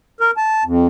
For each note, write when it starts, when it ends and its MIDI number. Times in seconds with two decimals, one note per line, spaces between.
0.21 0.31 70
0.37 0.64 81
0.65 0.87 41